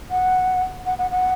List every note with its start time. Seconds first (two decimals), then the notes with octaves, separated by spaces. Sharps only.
0.11 F#5
0.86 F#5
0.98 F#5
1.11 F#5